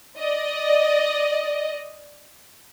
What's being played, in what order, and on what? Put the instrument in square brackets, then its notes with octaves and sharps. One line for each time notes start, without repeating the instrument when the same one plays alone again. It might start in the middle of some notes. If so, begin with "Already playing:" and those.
[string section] D5 D#5